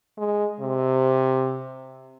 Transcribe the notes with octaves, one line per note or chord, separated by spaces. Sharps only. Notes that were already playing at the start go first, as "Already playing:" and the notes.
G#3
C3